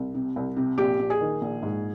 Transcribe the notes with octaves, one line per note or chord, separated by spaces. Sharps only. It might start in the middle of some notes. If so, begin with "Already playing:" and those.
Already playing: C2
C3
C2
C3
A#1 G4
A#1
G#4
D#3
A#1
G#2